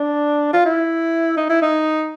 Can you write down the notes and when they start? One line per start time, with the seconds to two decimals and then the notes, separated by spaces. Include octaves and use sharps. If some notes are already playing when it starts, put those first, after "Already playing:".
Already playing: D4
0.53 F4
0.66 E4
1.37 D#4
1.50 E4
1.62 D#4